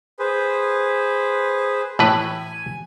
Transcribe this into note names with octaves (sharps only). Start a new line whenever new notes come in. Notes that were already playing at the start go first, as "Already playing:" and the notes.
G#4 B4 C5
A2 E3 B4 G#5